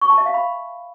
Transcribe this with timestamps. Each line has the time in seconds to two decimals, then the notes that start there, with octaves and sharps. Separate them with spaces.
0.01 C#6
0.10 A5
0.18 E5
0.26 F5
0.34 B5